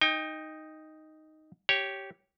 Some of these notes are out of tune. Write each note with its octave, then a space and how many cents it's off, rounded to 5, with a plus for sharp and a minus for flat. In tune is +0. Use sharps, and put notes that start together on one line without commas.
D#4 +0 G5 +30
G4 -10 C#5 +0